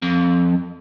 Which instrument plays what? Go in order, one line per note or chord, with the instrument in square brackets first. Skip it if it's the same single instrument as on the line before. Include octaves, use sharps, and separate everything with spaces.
[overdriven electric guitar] F2